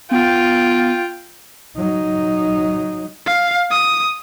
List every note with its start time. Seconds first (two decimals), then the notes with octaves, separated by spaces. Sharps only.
0.11 B3 F4 G5
1.77 F#3 D#4
3.26 F5
3.71 D#6